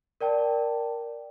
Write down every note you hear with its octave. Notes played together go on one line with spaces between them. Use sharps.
A#4 D5 G5 A5